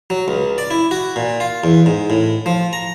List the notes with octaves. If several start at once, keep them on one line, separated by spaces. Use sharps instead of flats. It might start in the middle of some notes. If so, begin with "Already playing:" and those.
F#3
C#2
D5
E4
F#4
A#2
F4
E2
G#2
A2
F3
A#5